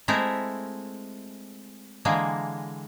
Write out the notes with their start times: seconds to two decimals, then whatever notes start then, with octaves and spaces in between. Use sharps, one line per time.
0.08 G#3 A3 C4 E4 A#4
2.05 D3 E3 G#3 A#3